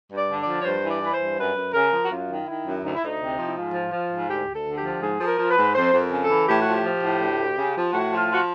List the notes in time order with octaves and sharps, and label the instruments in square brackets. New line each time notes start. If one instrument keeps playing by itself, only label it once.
[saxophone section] G2 D5
D3
D5
F3
C#5
G2 C5
E3
D5
E3
B4
C5
G2
F#2 B4
F#2
C#3 A#4
F3
F#4
F#2 F4
D#3
D#3 E4
F#2
D2 D#4
E4
D2 D#4
C3
F3
E4
G#2 F4
F3
F3
G#2
D2 G4
D2
A4
D3
G4
F3
G#2 G#4
F3 A4
A#4
F3
G#2 B4
F2 C5
F2
A#4
C#3
A4
E3
A2 G4
F3 F#4
G4
F3
A2
D2
D2
C#3
F3
A2 F#4
F3
F4
F3 F#4